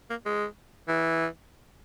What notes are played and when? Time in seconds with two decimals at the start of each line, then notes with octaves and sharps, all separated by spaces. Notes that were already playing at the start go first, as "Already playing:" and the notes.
0.10 A#3
0.26 G#3
0.88 E3